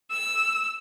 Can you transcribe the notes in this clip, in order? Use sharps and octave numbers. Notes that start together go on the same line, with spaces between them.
E6